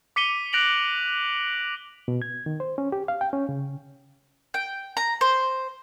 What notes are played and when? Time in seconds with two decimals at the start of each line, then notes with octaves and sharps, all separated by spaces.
0.16 D6 B6 C#7 D#7 G7
0.53 F#6 A#6 D7 F7 F#7
2.08 B2
2.22 G#6
2.46 D#3
2.60 C5
2.78 C#4
2.92 G4
3.08 F5
3.21 G5
3.33 C#4
3.49 C#3
4.54 G5
4.97 A#5
5.21 C5